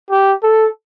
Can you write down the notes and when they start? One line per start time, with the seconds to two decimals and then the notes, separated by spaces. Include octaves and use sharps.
0.10 G4
0.43 A4